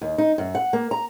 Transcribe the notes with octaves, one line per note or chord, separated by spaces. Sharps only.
D#2
D#4
F#2
F#5
A#3
A#5